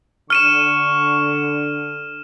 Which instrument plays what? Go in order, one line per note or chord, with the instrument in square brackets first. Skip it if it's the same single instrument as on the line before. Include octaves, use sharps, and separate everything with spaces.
[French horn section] D3 [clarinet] C#6 [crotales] F6 D#7 E7